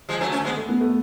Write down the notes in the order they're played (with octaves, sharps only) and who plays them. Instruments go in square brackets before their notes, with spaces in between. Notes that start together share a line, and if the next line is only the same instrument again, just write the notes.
[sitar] F3 G#3
F#3 A3
A3 C#4
G#3 B3
[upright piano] A3
B3
A3